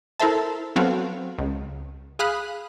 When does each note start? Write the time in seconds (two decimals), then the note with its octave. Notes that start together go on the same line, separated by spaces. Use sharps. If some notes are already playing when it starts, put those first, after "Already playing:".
0.20 E4 A4 A#4 C5 E5 A5
0.76 F#3 B3 C4 F#4 A4 F5
1.38 C#2
2.19 G#4 F5 B5 D#6 F#6